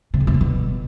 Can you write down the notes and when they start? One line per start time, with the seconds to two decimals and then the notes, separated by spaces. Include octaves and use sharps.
0.14 C3
0.20 F2
0.27 C3
0.34 C#3
0.41 B2